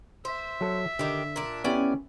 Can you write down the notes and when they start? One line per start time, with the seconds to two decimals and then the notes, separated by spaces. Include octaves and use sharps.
0.25 C5 E5
0.61 F#3 A4
0.99 D3 D#3 G4
1.36 A#2 D4
1.64 B3 C#4 E4 G4 D5 G#5